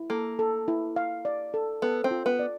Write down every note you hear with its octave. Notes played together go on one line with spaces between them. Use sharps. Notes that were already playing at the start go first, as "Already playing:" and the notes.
Already playing: E4
A#3 A4
A4
E4
F5
D5
A4
B3 A4
C4
F4
B3
D5